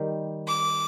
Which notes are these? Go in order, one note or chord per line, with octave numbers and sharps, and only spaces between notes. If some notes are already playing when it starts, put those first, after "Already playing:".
Already playing: D#3 G3
D6